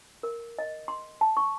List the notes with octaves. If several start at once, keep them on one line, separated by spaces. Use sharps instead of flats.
A#4
D#5
C6
A5
C#6